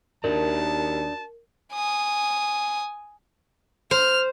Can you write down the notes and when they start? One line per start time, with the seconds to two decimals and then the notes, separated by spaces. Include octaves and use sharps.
0.24 D#2 D4 F#4 A#4 D5 A5
1.73 G#5 D#6
3.91 C5 F6